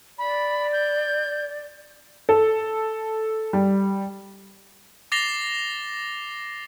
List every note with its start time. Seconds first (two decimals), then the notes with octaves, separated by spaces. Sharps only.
0.18 D5 B5
0.73 G6
2.29 A4
3.53 G3
5.12 D6 A6 A#6 C7 F7 G7